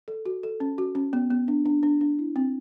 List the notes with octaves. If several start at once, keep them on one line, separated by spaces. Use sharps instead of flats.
A4
F#4
A4
C#4
F#4
C#4
B3
B3
D4
D4
D4
D4
E4
C4